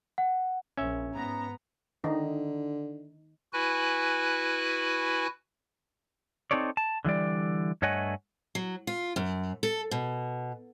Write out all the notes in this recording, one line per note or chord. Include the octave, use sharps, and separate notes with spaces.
F#5
A#1 C#4 E5
G#2 B3 A#5
D3 D#3 D#4
E4 F#4 B4 G#5 F#6
C4 D#4 A4 C#5 D5
A5
D3 E3 G3 D5
G2 A3 C#5 D#5 F#5 G#5
F#3
F4
F#2
A4
B2